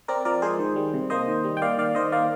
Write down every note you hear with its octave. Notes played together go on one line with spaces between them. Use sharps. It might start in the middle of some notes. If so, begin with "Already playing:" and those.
C4 A#4 D5
F3 A#4 D5
G#3 G#4 C5
D#3
G3
C3
A#3 C5 D#5
D#3
G3
G5
A#3 D5 F5
D#3 D5 F5
D#3 C5 D#5
A#3 D5 F5